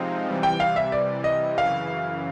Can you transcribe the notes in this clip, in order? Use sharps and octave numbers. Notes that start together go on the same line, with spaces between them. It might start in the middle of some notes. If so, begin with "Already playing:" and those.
Already playing: C3 F3 G#3 C4 D#4 F5
C3 E3 G3
G5
F5
E5
D5
D#5
F#2 C#3 E3 F5